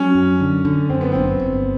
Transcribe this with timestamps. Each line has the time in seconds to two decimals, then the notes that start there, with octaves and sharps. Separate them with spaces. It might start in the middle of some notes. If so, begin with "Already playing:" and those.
Already playing: F#3 C#4
0.15 F#2
0.40 D3
0.65 D3
0.89 F#2 C4
1.01 B3
1.12 G1 C4
1.39 G1